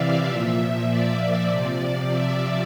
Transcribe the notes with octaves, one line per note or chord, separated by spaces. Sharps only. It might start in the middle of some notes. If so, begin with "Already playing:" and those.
Already playing: C3 E3 D5 E5 F5
A#2 F3 E5
D5
C3 F3 D5
D5
E5